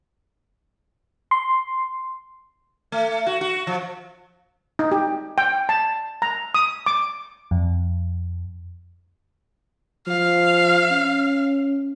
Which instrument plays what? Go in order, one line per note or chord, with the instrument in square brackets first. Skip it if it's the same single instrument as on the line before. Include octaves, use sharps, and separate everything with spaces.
[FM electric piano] C6
[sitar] A3
F#4
F#4
F3
[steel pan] D#4
G4
G5
A5
A#5
D#6
D6
[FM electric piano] F2
[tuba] F3 [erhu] F5
[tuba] C#4